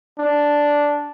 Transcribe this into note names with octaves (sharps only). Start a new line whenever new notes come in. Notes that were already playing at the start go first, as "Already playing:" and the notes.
D4